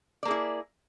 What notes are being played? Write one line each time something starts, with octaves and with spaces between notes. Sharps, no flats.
A#3 E4 G#4 D5